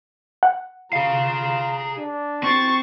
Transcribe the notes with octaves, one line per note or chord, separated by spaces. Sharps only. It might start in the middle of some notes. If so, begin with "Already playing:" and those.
F#5
F4 G#4 F5 A#5
D4
C4 C#6 A6